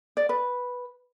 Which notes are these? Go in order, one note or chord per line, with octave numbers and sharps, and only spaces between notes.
D5
B4